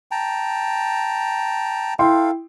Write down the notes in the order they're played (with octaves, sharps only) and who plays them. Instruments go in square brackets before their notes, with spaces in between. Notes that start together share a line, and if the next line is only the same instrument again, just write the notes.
[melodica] G5 A5 A#5
[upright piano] E4 G5 C6 [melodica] A4 F5